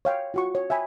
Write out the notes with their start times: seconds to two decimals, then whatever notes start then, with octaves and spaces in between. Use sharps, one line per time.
0.05 C#5 F5 G5
0.34 F4 F#4 C#6
0.55 C#5
0.70 E5 G5 G#5 B5